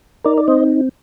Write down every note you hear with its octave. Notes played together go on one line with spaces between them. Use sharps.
D#4 A#4 D5
D5
C4 C5 D#5